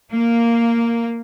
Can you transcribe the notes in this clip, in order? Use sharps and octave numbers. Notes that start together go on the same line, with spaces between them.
A#3